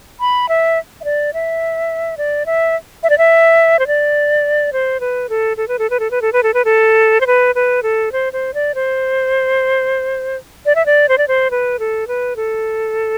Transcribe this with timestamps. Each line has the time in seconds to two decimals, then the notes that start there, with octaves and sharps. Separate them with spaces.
0.20 B5
0.49 E5
1.01 E5
1.04 D5
1.33 E5
2.17 D5
2.46 E5
3.03 E5
3.10 D5
3.18 E5
3.79 C5
3.87 D5
4.73 C5
5.00 B4
5.29 A4
5.57 A4
5.68 B4
5.79 A4
5.90 B4
6.00 A4
6.11 B4
6.22 A4
6.33 B4
6.43 A4
6.54 B4
6.65 A4
7.21 C5
7.27 B4
7.55 B4
7.83 A4
8.12 C5
8.33 C5
8.54 D5
8.75 C5
10.66 D5
10.75 E5
10.86 D5
11.09 C5
11.18 D5
11.28 C5
11.51 B4
11.79 A4
12.08 B4
12.36 A4